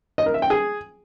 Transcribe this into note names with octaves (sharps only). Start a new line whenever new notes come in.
D#5
A#4
E5
G5
G#4